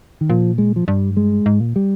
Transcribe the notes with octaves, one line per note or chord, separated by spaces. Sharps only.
D#3
A#2 F3
G#3
F3
G2 G3
G#3
G#2
A#2
G3